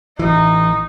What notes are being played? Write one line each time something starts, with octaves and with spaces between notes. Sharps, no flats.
A1 E3 D#4